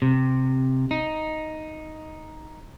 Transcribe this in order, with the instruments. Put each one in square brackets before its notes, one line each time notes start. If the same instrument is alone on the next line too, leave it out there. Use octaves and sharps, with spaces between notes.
[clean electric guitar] C3
D#4